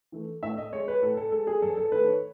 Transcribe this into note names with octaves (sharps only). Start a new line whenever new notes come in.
E3 A3
A2 E5
D#5
G#3 C#5
B4
A2 A4
A4
G#3 A4
G#4
F#2 A4
A4
D#3 A3 B4
C#5